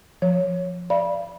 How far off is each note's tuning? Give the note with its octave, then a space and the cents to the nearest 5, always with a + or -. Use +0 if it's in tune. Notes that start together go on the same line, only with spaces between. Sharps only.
F3 +0 C#5 +0
D5 +0 F5 -40 B5 -25